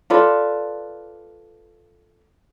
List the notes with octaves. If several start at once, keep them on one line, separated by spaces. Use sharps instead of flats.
F4 A4 B4 D5